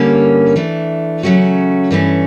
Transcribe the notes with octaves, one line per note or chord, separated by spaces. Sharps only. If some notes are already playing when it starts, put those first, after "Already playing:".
Already playing: G2 D3 G3 A#3 C#4
E3 A3 D4
C#3 F#3 A3 C#4 F#4
G2 E3 A3 C#4